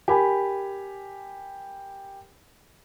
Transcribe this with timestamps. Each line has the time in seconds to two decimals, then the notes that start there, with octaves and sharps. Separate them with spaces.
0.08 G4 A#4 G#5 B5